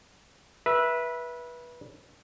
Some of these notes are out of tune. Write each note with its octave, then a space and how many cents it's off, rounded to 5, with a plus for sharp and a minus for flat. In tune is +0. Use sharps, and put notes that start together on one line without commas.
B4 -25 E5 +0